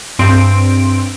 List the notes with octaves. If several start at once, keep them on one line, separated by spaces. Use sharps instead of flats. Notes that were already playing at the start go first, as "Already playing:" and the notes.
G2 C4 D7